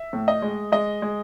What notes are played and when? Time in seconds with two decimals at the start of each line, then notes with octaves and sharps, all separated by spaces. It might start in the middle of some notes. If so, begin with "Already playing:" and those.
Already playing: E5
0.13 A2
0.28 D#5
0.42 G#3
0.72 G#3 D#5
1.02 G#3